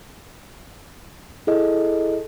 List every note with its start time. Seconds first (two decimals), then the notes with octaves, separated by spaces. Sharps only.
1.47 E4 G#4 A4 D#5